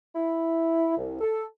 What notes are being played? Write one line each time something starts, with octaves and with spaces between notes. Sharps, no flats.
E4
C2
A4